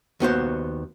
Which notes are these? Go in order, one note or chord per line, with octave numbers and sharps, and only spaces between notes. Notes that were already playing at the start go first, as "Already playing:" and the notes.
D#2 B3 F#4 C5